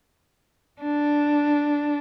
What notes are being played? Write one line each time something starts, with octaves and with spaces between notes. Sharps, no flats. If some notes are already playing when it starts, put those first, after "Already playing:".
D4